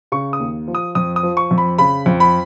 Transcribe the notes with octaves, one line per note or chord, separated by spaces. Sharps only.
C#3 C#6
D#6
D#2
F3
D#6
F2 D#6
D#6
F3
C#6
F2
B5
C#3 B5
F2
B5